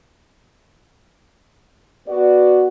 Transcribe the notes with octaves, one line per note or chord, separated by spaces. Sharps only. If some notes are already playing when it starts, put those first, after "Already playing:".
B3 F#4 B4 D5